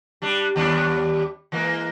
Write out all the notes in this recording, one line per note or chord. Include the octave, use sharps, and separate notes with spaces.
G3 D4
D#2 G3 D4
E3 G#3 A#3